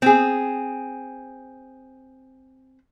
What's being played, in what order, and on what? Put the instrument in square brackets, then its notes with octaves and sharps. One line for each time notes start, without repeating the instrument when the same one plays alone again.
[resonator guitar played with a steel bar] C4 G#4